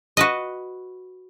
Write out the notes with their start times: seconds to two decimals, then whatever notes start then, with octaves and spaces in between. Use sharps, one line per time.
0.17 F#4 B4 D#5